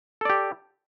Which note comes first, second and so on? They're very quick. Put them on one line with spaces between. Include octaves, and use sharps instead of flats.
A4 D5 G4